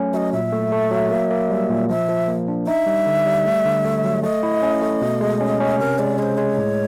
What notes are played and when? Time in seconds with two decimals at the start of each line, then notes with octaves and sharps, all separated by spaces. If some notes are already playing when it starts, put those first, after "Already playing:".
Already playing: F#3 A3 C#4
0.13 F#3 D#5 E5
0.33 A#2 E5
0.53 A3
0.72 A3
0.91 F#3
1.11 A#3
1.31 A#3
1.50 G3
1.69 A#2
1.89 F3 E5
2.09 F3
2.28 A#3
2.48 D4
2.67 D#4 E5
2.86 G3
3.07 D3
3.26 G3
3.45 A3
3.65 D3
3.85 A3
4.04 F#3
4.23 A3 D#5
4.43 E4
4.62 C#4
4.82 A3
5.02 B2
5.21 G#3
5.41 C#4
5.60 C#4
5.79 C3 A#4
5.99 G#3 D5
6.18 G#3 C#5
6.22 C5
6.38 G#3 C#5
6.58 A2